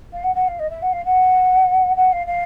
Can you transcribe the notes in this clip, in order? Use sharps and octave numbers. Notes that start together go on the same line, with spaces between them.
F5
F#5
F#5
F5
D#5
E5
F#5
F5
F#5
F#5
F5
F5